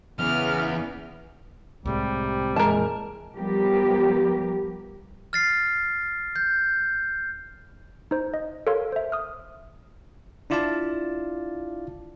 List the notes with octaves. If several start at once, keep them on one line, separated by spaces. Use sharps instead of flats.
E2 C#3 E3 B3 F6
C2 A2 C3 G3 G#3
F2 A#2 E3 G#3 A#4 A5
F3 G3 B3 G4 A#4
F6 A6 C7
G6
D#4 C5
D#5
A4 A#4 C#5 F5 C6
C5 E5
D#6 F6
D4 E4 F4 D5 F5 A5